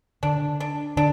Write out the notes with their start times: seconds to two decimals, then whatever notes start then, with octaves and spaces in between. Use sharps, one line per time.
0.23 D3 D4
0.60 D4
0.97 D3 D4